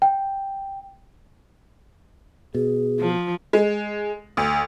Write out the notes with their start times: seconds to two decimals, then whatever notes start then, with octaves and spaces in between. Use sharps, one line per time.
0.02 G5
2.55 B2 G#4
2.99 F3
3.53 G#3
4.37 D2